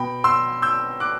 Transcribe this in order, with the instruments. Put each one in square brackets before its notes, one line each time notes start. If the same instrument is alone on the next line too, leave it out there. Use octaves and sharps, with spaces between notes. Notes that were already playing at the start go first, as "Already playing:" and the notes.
Already playing: [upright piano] B2 G5 B5
C6 E6
E6 G6
D6 F#6